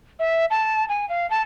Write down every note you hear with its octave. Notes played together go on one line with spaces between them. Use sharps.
E5
A5
G#5
F5
A5